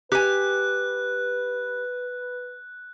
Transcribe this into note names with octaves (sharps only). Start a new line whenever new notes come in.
G4 B4 G#5 F#6